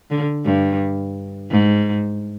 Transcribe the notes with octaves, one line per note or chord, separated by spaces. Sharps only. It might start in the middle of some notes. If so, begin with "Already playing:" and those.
D3
G2
G#2